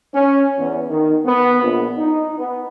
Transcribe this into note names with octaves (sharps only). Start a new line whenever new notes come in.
C#4
E2
D#3
B3
A#1
D#4
B3